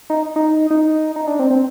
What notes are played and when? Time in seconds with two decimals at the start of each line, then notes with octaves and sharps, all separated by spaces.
0.10 D#4
0.36 D#4
0.71 D#4
1.16 D#4
1.27 D4
1.39 C4
1.50 C4